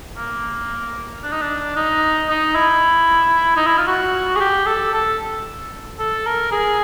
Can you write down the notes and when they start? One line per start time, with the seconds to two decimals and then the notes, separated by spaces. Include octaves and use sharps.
0.16 A#3
1.23 D4
1.32 D#4
1.42 D4
1.76 D#4
2.29 D#4
2.55 E4
3.57 D#4
3.66 E4
3.78 F4
3.87 F#4
4.36 G#4
4.40 G4
4.67 A4
4.94 A4
5.99 A4
6.26 A#4
6.52 G#4